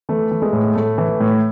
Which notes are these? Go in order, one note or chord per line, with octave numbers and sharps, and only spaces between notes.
E3 A3
E3
G#3
A2
A2 A3
E3
A2